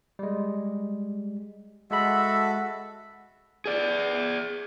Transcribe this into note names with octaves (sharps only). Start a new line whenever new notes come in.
G3 G#3
G#3 F#4 A4 E5 B5
G#4 D5